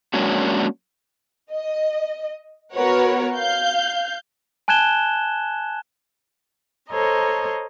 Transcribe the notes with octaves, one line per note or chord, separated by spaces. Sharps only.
F#3 G#3 A#3 C#4 D4 F#4
D#5
B3 F#4 A#4 B4 C#5 F#5
F5 G6
G#5 A5 F#6 G#6 E7 G7
A4 C5 C#5 D#5 A#5